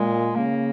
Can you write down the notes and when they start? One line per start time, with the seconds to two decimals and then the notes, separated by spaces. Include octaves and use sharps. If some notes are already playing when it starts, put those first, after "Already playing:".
Already playing: A#2 G#3
0.36 C#3 A#3